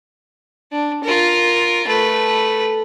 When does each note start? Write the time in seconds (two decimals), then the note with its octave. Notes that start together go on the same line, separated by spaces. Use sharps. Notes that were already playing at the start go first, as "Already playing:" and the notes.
0.72 D4
1.03 F4 A#4
1.87 A3 B4